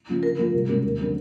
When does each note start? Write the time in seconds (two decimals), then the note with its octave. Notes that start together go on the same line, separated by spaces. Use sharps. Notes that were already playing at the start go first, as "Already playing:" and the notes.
0.09 C#3 F3
0.23 D3 A#4
0.38 F3 A3
0.54 C2
0.68 B2 G#3 C#4 F#4
0.84 D#2
0.98 D3 F#3 A3 C4